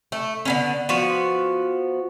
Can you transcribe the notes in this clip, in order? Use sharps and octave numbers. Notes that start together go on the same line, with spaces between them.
A3
D3 B3 C#4
F3 B3 F#4